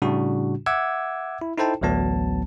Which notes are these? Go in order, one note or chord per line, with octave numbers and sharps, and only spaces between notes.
A2 C#3 G3 D4 F#4
E5 F#5 D6 E6 G#6
E4
D#4 E4 A4 C5 G5 A5
A1 D2 F#3 B3 A5